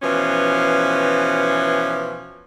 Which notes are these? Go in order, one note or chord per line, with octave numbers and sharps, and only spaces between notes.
B2 E3 F3 C#4